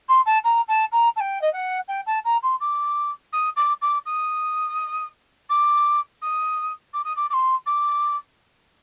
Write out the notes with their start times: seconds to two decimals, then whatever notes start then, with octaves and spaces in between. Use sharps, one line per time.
0.08 C6
0.26 A5
0.44 A#5
0.68 A5
0.92 A#5
1.16 A5
1.20 G5
1.41 D#5
1.53 F#5
1.88 G5
2.06 A5
2.24 A#5
2.42 C6
2.60 D6
3.32 D#6
3.56 D6
3.81 D6
4.05 D#6
5.49 D6
6.22 D#6
6.93 D6
7.04 D#6
7.16 D6
7.30 D6
7.33 C6
7.66 D6